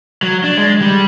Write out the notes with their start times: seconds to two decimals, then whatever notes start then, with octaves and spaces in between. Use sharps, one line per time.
0.23 F#3
0.44 D4
0.57 G#3
0.81 G3